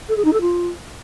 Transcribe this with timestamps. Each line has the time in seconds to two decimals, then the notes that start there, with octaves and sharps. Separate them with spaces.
0.08 A4
0.16 G#4
0.25 D#4
0.33 A4
0.41 F4